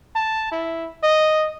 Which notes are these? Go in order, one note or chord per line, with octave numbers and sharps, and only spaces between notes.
A5
E4
D#5